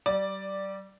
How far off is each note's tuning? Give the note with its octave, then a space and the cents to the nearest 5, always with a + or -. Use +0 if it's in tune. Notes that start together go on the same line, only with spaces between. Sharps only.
G3 -30 D5 +0